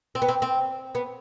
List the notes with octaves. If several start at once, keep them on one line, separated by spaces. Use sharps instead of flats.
C4
B3
C4
C4
B3